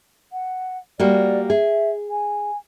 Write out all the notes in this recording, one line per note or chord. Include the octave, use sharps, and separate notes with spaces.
F#5
G3 A#3 F#4 D5
G#4 E5
G#5